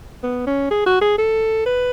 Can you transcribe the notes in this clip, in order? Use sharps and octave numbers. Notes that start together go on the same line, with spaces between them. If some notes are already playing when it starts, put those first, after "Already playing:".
B3
C#4
G#4
F#4
G#4
A4
B4